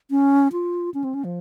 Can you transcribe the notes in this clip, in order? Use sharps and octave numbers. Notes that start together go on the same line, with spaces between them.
C#4
F4
C#4
C4
C#4
F3